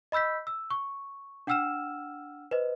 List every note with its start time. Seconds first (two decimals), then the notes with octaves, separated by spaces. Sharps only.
0.12 D#5 B5 E6 G6 B6
0.47 E6
0.70 C#6
1.47 D4 F#5 G5 E6 F6 E7
2.51 B4 C5 D#5